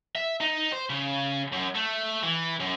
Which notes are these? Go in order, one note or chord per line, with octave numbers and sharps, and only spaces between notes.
E5
D#4
C5
C#3
F#2
A3
E3
F#2